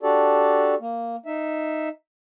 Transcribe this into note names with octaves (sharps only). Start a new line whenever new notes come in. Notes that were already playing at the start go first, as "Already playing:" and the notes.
D4 F#4 G4 A4 D5
A#3
D#4 E5